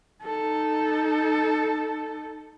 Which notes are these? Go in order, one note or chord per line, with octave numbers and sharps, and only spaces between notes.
D#4 A4